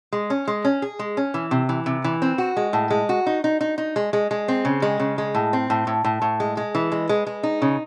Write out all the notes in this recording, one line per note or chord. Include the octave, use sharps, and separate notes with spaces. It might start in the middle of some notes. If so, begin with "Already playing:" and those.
G#3
C#4
G#3
C#4
G#4
G#3
C#4
E3
C3
E3
C3
E3
C4
F#4
G#3
A2
G#3
F#4
D#4
D#4
D#4
D#4
G#3
G#3
G#3
C4
C#3
G#3
C#3
G#3
A2
C4
A2
A2
A2
A2
G#3
G#3
E3
G#3
G#3
G#3
D#4
C#3